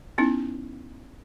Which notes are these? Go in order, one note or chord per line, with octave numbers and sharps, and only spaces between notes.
B3 C#4 D#4 E4